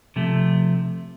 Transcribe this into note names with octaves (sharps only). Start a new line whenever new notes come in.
C3 F3 A3